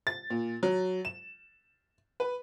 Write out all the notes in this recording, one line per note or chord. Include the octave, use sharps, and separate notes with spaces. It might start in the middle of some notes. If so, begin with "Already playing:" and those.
A6
A#2
F#3
E7
B4